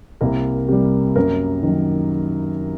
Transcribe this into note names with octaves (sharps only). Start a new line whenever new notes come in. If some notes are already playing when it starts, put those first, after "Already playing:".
C2 A#3 A#4
C3 G3 G4
F#2 A#3 A#4
D#3 F#3